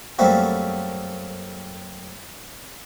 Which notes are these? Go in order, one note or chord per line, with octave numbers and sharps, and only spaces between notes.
F#2 G3 A3 A#3 C4 F#4